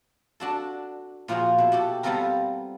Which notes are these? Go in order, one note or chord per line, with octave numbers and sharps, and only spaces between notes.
D4 F#4 A4
A#2 F3 F4 F#4 G#4
B2 E4
F#4 G4 A4
G3 B3 C4 F4 A4 A#4